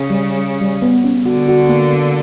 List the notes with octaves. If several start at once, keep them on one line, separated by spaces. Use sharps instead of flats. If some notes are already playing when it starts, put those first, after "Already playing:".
Already playing: C#3
G3
G3
B3
C#4
D3 F#4
F#4
A#3
A#3